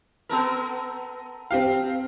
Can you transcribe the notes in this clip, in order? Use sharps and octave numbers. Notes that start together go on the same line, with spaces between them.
B3 A4 A#4
C4 G4 F5